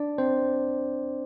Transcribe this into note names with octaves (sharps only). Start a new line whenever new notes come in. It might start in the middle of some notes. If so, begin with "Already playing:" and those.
Already playing: D4 D5
C4 C5